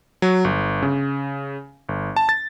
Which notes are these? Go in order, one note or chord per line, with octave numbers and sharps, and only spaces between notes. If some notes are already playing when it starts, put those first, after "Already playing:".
F#3
G1
C#3
G1
A5
A6